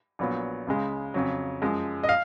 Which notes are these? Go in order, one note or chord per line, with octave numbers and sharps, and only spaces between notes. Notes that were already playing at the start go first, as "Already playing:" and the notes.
A#1 A#2 F#3 B3
C#2 C#3 G#3
F2 C#3 F#3
F#2 F3 G#3
D#5
F5